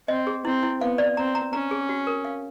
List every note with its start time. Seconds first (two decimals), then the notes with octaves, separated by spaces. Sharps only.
0.08 C4 D#5
0.27 G#4
0.45 C4 E4
0.63 E4
0.81 B3 F5
0.98 D5
1.17 C4 A#5
1.35 A#5
1.53 C#4 A#5
1.71 G#4
1.89 F#4
2.07 A#4
2.25 F5